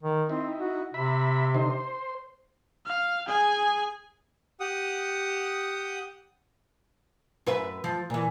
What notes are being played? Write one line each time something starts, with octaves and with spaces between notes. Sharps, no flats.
D#3
C4 D#4 E4
F#4
C3 E5 B5
D3 D#4 C5
C5
F5
G#4 G#5
G4 F#5 D#6
F#2 B4 E5
F3
A#2 E3